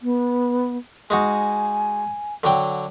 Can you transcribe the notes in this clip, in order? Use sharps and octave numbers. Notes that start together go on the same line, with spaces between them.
B3
G#3 D#4 F#4 G#5
D3 F#3 G5